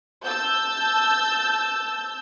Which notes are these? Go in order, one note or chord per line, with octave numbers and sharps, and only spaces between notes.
A5 E6 G6